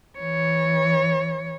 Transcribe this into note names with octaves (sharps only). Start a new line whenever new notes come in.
E3 C#5